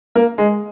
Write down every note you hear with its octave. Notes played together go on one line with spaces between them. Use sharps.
A#3
G#3